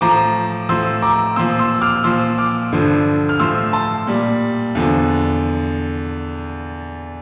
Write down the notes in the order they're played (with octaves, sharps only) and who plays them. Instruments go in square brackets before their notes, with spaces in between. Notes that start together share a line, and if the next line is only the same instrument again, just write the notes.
[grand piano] A2 F3 A#5 D6
A2 F3 C6 E6
A#5 D6
A#2 F3 C6 E6
C6 E6
D6 F6
A#2 F3 C6 E6
D6 F6
G2 D3 F3
F6
A2 F3 C6 E6
A5 C6
A#2 G3
E2 D3 F3